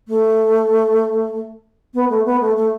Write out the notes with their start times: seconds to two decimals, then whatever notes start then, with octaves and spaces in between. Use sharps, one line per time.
0.08 A3
1.94 B3
2.09 A3
2.26 B3
2.41 A3
2.56 A3